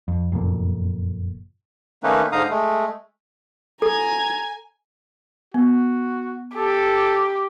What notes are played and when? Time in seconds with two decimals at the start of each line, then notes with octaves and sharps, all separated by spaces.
0.08 F2
0.32 F#1 F2 A#2
2.03 D#3 A3 A#3 C#4 D#4 B4
2.32 G#2 D3 D#4 F5 A#5 D#6
2.50 G#3 A3
3.82 A4 G#5 A#5 G#6
5.54 B3 F#4
6.56 G4 A4